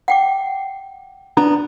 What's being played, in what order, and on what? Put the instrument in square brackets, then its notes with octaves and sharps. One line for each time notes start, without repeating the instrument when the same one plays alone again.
[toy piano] F#5 G5 D6
[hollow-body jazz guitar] B3 D4 A#5